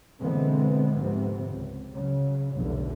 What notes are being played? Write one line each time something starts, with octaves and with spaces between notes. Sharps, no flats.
B2 D3 E3 G#3 B3 C4
D2 G#2 C3 F3 B3 C4
C#2
C#3 F#3
F1 B1 E2 D3